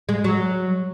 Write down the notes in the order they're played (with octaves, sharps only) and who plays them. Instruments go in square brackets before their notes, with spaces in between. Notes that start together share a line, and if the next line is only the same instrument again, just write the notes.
[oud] G#3
F#3